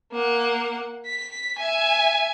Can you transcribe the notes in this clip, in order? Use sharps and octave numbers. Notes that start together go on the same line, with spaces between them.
A#3 F#5
B6
E5 G#5